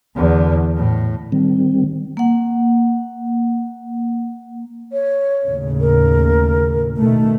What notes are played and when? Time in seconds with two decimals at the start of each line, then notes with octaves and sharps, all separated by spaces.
0.15 E2 D3
0.76 A2
1.32 D#3 G3 C4
2.17 A#3 F#5
4.93 C#5
5.45 D#2 A2 C#3
5.80 A#4
6.97 B2 D#3 A3